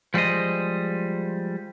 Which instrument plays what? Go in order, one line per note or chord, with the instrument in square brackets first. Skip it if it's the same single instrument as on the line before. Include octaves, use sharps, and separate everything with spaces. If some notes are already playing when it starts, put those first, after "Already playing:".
[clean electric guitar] F3 G3 G#3 C5 D#5